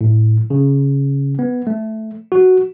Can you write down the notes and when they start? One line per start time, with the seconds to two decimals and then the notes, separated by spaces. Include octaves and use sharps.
0.01 A2
0.50 C#3
1.39 B3
1.67 A3
2.32 F#4